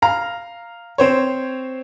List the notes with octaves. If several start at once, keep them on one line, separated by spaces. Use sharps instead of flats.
F5 A#5
C4 C5 C#5